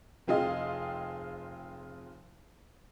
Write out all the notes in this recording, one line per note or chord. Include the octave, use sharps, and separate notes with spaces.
F1 C4 F4 G#4 D#5 F5